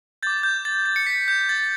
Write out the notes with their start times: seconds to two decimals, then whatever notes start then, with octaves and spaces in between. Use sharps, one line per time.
0.23 D6 G6 A6
0.43 G6
0.65 A6
0.85 A6
0.96 C#7
1.06 B6
1.28 G6
1.41 G6
1.49 A6